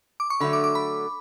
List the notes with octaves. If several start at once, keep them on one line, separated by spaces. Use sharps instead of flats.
D6
C#6
D3 F#3 A3 B5
D6
D6
B5